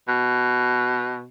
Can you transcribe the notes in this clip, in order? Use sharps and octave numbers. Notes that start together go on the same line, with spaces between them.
B2